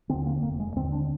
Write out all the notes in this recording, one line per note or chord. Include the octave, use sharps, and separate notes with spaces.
D#2 D3 C4
A#3
F1 A#3
G#3
D#2 D3 C4
D4